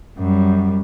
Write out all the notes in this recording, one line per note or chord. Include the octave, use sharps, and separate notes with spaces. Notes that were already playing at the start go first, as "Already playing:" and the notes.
F#2 G3